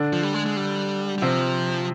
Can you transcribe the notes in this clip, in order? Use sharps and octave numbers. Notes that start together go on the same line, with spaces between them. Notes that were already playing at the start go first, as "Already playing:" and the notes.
Already playing: D3 D4
F3
G3
G#3
G#3
G3
G3
C3 F3 C4